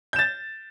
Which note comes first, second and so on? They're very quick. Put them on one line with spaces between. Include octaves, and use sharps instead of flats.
G6 E7 A6